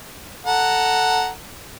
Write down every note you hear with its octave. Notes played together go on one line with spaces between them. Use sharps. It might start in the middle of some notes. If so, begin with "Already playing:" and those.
A4 F#5 A#5